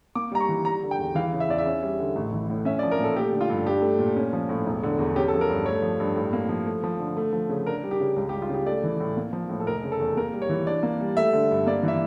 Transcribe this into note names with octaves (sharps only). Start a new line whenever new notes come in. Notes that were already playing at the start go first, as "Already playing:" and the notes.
A#3 D6
G3 A#5
C#6
E3
G3 A#5
D3
G5
E2
E3 F5
C#3
E5
E2 D5
E5
C#4
G3
D3
A1
E3
A2
C#4 E5
D5
F3
A#4
A#2 A4
A3 G4
D3
F4
G2
D4 G4
A3
A#2
C#4
F3
A2
E1
D3
E2
C#4 G4
A4
F3
A#4
G2
A3 C#5
F3
G2
A2
A#3
F3
A3
F3
D3
A3
F3
C#3
D4 A#4
G3
G4
C#3
C#2
G4
G3
F4
C#3
G4
A3 D5
E3
A2
A#3
F3
A2
A4
F1 A#4
C#3
A4
E2
A#3 A#4
G3
C#5
E3
D4 D5
A#3
G3
A3 E5
D3
G2
A#3 D5
E3 E5